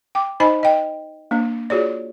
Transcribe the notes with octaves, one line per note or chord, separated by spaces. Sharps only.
G5 D6
D#4 C5 D#5 G#5 B5
D#5 G5
A#3 D4
F4 F#4 G#4 C#5 D5